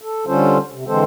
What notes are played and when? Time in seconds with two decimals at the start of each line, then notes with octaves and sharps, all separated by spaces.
0.01 A4
0.27 D3 G3 C#4 F4 A4 C5
0.72 C3
0.87 D3 E3 G#3 C4 A4 C5